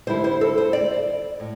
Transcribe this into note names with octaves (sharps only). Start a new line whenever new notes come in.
D3 G3 E4 C5
C5
A4
C5
D5
A2